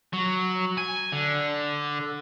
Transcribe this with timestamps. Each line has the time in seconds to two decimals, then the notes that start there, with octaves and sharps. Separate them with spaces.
0.13 F#3
0.78 G#5
1.12 D3